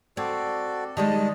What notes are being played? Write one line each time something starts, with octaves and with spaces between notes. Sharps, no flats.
C4 F#4 A4 D5
D#3 G3 G#3 D#5 A5